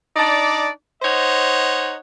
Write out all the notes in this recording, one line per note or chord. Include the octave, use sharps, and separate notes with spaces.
D4 D#4 D5
D#4 C5 C#5 D#5 F#5